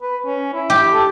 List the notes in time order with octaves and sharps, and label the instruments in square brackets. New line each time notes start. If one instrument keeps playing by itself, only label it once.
[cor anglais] B4
C#4
E4
[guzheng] G4
[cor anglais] A4